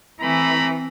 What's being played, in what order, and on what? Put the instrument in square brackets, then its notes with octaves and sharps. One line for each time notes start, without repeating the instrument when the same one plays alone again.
[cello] E3 [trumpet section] A3 A#5 B5 [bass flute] C4